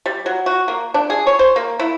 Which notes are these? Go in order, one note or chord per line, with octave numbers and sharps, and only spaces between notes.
G3
F#3
F#4
A#3
D4
G#4
C#5
C5
A#3
E4